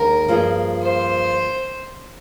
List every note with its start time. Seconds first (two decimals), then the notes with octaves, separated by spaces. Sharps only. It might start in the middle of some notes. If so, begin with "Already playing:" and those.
Already playing: D#2 D#3 G#3 D4 A#4
0.28 G2 F3 A#3 F4 G#4
0.82 C5